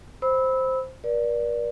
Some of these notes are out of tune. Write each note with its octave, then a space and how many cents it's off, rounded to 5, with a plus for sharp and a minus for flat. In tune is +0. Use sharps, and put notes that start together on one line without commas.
C5 +0 B5 +0 E6 -20
A#4 +45 D5 +0